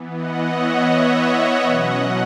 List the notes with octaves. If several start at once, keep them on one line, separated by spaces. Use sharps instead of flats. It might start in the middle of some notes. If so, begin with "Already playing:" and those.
Already playing: E3 B3
D#5 F#5
C#5 E5
C#5 E5
B2 F#3 C#4 D#5 F#5